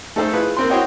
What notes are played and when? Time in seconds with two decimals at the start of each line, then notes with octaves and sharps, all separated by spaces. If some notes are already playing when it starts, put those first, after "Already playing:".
0.16 A3 D#4 A4 C5 E6
0.33 E4 F4 G#4 B4
0.57 A#3 C4 C6
0.70 E4 F#4 C5 C#5 D#5 G5